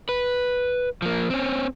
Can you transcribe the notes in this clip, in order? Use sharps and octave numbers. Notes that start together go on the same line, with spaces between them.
B4
F3 A#3
C4 C#4